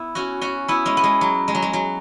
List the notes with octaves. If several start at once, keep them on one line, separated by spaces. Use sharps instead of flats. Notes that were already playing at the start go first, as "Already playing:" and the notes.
Already playing: B3 E4
C#4 F#4
C#4 F#4
B3 E4
G#3 C#4
B3
G#3
F#3
G#3
F#3
G#3
F#3